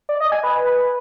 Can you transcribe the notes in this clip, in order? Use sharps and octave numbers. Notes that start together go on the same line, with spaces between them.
D5
D#5
G#5
B4